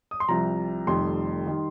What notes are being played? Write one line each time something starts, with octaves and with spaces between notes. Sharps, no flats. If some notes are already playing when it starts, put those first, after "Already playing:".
D#6
C6
C2 C3 F3 A#5
F1 F2 D#3 G3 C6
D#3 G3